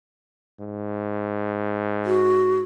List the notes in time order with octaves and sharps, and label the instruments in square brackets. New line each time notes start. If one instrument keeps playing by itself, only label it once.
[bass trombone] G#2
[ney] F#4